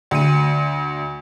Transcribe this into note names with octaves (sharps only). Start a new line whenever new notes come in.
D2 D#7